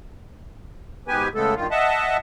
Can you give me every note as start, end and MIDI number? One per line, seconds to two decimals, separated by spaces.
1.08 1.28 44
1.08 1.28 47
1.08 1.28 59
1.08 1.28 67
1.08 1.28 71
1.08 1.28 80
1.35 1.54 49
1.35 1.54 56
1.35 1.54 57
1.35 1.54 59
1.35 1.54 69
1.56 1.67 43
1.56 1.67 51
1.56 1.67 65
1.71 2.17 75
1.71 2.17 76
1.71 2.17 78
1.71 2.17 81